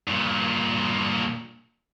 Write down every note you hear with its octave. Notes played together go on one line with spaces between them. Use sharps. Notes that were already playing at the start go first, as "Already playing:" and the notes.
G2 A#2